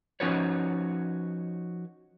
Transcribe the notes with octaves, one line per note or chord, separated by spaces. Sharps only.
F3 C#4 D#4 F#4 B4 C#5